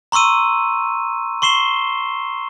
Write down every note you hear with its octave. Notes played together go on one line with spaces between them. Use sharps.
A#5 C6 C#6 E6 D#7
C6 C#6 C7 E7 G7